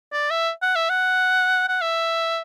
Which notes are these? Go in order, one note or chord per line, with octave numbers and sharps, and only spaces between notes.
D5
E5
F#5
E5
F#5
F#5
E5